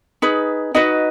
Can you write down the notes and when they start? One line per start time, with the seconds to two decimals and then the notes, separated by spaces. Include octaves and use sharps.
0.22 D#4 G#4 B4
0.75 D#4 F#4 B4 D#5